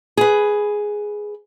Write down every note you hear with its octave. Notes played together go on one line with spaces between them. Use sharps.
G#4 B4